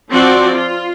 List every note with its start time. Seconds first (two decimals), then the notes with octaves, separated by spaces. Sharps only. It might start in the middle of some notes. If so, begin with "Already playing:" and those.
0.12 F3 C4 F#4 D5
0.54 F4